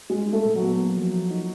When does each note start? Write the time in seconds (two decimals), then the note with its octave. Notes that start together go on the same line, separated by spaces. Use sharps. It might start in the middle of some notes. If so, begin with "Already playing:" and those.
0.10 G3 G#3 G#4
0.27 D#4
0.33 A3 A4
0.45 A#2
0.56 F#3 F#4
0.62 B3
0.79 A#3
0.97 F3
1.13 F3
1.31 D#4